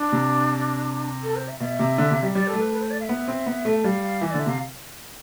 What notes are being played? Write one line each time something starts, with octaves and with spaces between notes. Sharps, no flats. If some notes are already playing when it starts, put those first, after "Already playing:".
Already playing: D4
C3
A4
C5
E5
B2 E5 F5
C3
D3
C3
G3
G3 D5
A4
A3
B4
B4
C5
D5
F5
E5
B3
C4
B3
A3
G3 F5
F5
E3 E5
D5
D3
E5
C3 F5